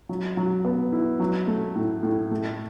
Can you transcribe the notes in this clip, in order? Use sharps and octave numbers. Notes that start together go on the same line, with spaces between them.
F#3
F#3
B3
E4
F#3
A3
A2
A2
A3